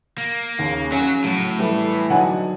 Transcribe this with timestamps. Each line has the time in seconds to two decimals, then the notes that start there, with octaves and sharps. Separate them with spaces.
0.18 A#3
0.59 D#2 C#3
0.92 F#3 C#4
1.24 A2 F#3
1.59 E3 G3 A3
2.10 D3 F#3 D#4 F#5 G#5 A5